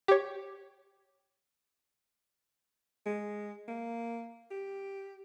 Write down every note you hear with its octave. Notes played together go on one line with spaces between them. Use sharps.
G4 C#5
G#3
A#3
G4